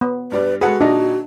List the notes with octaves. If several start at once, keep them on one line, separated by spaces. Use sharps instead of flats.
B3
G2 G3 B4 D5
G#3 F#4 G#4 A4 B4 F#5
A#2 D4 D#4 D#5